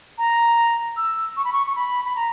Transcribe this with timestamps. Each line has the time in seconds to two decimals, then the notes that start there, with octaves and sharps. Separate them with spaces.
0.18 A#5
0.97 E6
1.36 C#6
1.44 B5
1.52 C#6
1.66 C#6
1.75 B5
2.04 B5
2.16 A#5